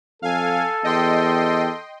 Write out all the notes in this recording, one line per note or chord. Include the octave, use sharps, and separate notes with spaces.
F2 A4 F5 G#5
E2 D#5 G5 C6